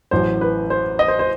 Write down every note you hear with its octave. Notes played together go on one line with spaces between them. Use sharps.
A1 A2 F#3 C5
B4
C5
D#5
C5
C5